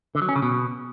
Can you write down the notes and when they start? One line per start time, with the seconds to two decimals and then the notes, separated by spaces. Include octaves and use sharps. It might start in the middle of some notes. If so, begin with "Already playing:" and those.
0.15 D3
0.22 F#3
0.29 C#4
0.36 C#3
0.42 B2